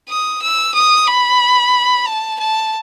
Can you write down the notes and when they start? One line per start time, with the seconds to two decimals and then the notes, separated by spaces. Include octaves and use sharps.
0.09 D#6
0.42 E6
0.74 D#6
1.08 B5
2.07 A5
2.40 A5